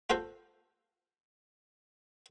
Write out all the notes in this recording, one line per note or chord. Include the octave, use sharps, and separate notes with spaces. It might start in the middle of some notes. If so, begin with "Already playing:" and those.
F4 F#4 A4 C5